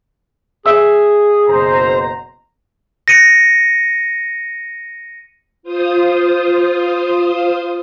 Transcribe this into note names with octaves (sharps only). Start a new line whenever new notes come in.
G#4 E5 E6
F#1 B2 C5 A#5
A#6 C#7 D#7
F4 C5 D#6